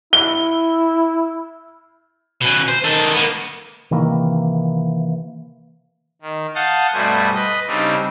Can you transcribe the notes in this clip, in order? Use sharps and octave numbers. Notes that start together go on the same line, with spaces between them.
E4 G7
B2 C#4
C5
D#3 A4
A#3 B3
C3 D#3 E3 A#3
D#3
F5 F#5 A5 D#6 G6
G2 B2 G3 A3 C5 G#5
B4 D#5
C#3 G3 C4 D4 D#4